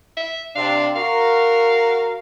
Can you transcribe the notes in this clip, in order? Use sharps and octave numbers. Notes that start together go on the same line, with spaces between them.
E5
C3 D4 F5
F#4 A#4 F5